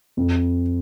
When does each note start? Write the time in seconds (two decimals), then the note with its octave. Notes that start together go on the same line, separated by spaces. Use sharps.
0.17 F2